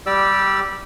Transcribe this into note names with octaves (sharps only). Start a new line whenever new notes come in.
G3 G4 D5 E6